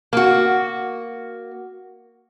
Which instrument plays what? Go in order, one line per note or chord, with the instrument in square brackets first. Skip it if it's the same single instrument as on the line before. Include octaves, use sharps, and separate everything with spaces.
[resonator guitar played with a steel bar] A#3 F#4